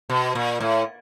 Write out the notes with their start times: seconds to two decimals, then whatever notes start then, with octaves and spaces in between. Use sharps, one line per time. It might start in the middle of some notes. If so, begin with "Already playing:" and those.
0.10 B2
0.35 A#2
0.60 A2